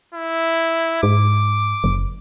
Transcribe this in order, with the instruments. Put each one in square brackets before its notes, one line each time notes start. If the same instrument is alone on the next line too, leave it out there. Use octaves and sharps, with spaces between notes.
[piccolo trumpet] E4
[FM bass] G#2 [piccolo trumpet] D6
[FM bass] F#1